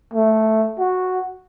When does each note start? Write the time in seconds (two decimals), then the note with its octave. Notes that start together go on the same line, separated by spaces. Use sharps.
0.14 A3
0.79 F#4